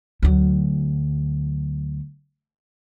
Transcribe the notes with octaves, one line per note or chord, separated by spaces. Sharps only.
D2 F#3